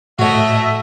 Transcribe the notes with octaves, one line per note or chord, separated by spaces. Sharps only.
A2 A3 F#4 C#5 D#5 E5